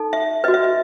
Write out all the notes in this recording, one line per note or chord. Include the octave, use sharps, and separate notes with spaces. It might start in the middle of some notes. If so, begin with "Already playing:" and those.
Already playing: D#4 A4
E5
F#4 B4 D#5
E5
E5